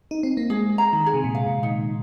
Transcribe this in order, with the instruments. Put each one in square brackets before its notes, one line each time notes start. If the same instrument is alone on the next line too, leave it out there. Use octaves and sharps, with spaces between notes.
[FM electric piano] D#4
C4
A#3
[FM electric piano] G#3 [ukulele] G#4
[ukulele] A#5
[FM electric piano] D#3
[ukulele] G#4
[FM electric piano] C3
A#2
[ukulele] F5
[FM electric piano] A#2
[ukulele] D#4